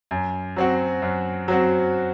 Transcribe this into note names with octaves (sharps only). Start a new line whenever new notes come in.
F#2
F#3 C4 F#4
F#2
F#3 C4 F#4